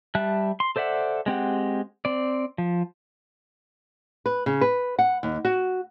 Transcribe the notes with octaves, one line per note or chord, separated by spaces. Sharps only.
G3 E5 A5 F#6
C6
A4 C5 D5 E5 F#5
G#3 C4 G4 F#5
C4 D5
F3
B4
C#3
B4
F#5
D#2
F#4